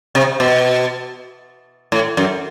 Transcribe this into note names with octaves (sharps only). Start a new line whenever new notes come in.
C3
B2
A2
F#2